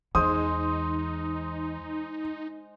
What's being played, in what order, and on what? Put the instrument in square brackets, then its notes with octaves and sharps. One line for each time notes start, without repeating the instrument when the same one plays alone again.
[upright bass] E2 [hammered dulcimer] G#3 C5 [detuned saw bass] D#4 [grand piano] D#6